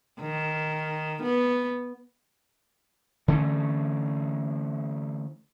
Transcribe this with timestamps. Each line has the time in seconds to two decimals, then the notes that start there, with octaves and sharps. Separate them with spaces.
0.21 D#3
1.23 B3
3.28 D3 E3 A3 C#4